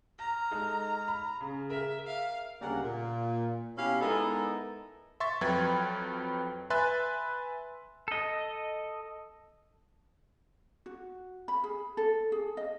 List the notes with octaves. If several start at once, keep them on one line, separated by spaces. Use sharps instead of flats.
A#5 F6 A#6
G#3 D#4 A4
B5
C#3 G#4
A#4 E5
E5 F5
D2 C#3 G3 A#3 A#4 F#5
A#2
B2 C#4 E4 G4 F5
G#3 B3 D#4 E4 A4 A#4
E5 C6 C#6 A6
F2 F#3 B4 G5 B5 G#6
B4 E5 G#5 C6 F#6 A6
A4 D#5
F#4
B5
G#4
A4
G#4
D#5